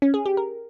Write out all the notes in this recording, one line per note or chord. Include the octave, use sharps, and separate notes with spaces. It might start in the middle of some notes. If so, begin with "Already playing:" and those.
C#4
G#4
G4
A#4